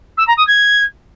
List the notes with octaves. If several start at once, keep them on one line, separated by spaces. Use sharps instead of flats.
E6
A#5
D#6
G#6